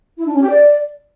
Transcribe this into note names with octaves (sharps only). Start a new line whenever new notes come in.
E4
D4
C#4
G4
D5